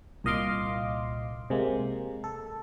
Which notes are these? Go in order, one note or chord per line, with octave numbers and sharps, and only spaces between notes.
C2 A#2 D#5 F5 C6 D6
C3 G#3 A#3
A4